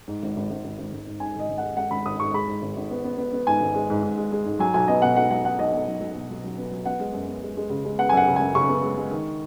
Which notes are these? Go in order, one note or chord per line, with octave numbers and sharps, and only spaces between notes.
G#2
G#1
G#1
G#1
G#1
G#1
G#1
G#2
G#2 G#5
G#1 D#5
G#1
F#5
G#3
G#3 F#5
G#1 B5
G#1 D#6
G#2 C#6
G#3 B5
G#2
G#1
G#1
B3
B3
B3
B3
G#2 G#5
G#1
G#3
G#2
G#2
G#3
G#3
G#2
F#3 G#5
B1 G#5
B3 D#5
B2 F#5
B1 F#5
F#3 F#5
B3 F#5
B1 D#5
B2
B1
B1
B2
F#3
F#3
B3
F#3
B3 F#5
G#3
F#2
B3
G#3
G#3
C#3
G#3
B3 F#5
G#5
F#2 F#5
C#3
F#2 G#5
C#3 C#6
B3
G#3
G#3
D#3